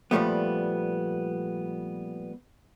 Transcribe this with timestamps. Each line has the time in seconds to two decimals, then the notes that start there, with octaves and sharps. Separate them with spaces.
0.11 A#2 F3 G3 A3 B3